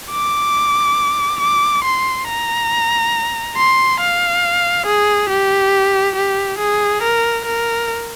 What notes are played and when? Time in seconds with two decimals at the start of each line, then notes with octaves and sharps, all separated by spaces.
0.12 D6
1.41 D6
1.85 C6
2.28 A#5
3.57 C6
4.00 F5
4.86 G#4
5.29 G4
6.16 G4
6.59 G#4
7.02 A#4
7.45 A#4